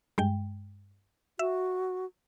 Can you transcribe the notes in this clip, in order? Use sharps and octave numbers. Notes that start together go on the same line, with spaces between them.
G2 G#3 G5
F#4 E5